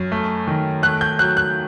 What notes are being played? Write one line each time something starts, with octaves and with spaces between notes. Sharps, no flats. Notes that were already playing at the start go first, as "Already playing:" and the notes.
Already playing: F#2
A3
D#3
A3 F#6
G6
F#3 F#6
F#6